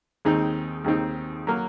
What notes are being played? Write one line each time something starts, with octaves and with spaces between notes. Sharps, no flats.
D#2 D#3 G#3 C4 D#4
D#2 D#3 G#3 C4 D#4
F#3 A#3